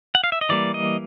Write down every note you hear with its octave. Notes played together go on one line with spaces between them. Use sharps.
F#5
F5
E5
D#5
E3 G3 A#3 D5
D#5